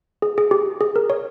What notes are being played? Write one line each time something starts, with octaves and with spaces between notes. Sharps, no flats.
G#4
G#4
G4
G#4
A#4
C#5